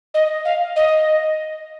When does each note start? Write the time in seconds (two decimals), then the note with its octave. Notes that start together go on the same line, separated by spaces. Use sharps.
0.14 D#5
0.45 F5
0.76 D#5